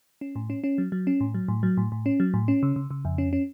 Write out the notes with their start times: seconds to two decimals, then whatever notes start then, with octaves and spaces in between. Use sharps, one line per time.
0.21 C#4
0.36 A2
0.50 C#4
0.64 C#4
0.78 F#3
0.92 F#3
1.07 C#4
1.20 A2
1.34 F#3
1.48 A2
1.63 F#3
1.77 A2
1.92 A2
2.06 C#4
2.20 F#3
2.34 A2
2.48 C#4
2.63 C#3
2.76 C#3
2.91 C#3
3.05 F2
3.18 C#4
3.33 C#4